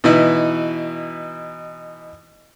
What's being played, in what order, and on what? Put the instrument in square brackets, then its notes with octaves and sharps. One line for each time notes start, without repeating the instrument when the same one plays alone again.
[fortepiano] B2 E3 D#4 E4